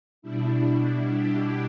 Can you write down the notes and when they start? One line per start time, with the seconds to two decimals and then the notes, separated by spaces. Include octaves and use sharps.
0.22 B2 G3 D4 E4
0.67 E4
1.10 G4